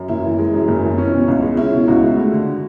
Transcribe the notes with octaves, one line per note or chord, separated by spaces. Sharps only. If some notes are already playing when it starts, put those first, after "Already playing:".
Already playing: F#2
F#1 E4
E3
G#3
F#2
F#1
E3
C#4
B2
C#2
G#3
C#4 E4
B2
C#2 F#4
G#3
A3
D3